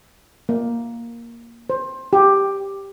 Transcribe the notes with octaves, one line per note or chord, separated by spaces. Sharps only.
A#3
C5
G4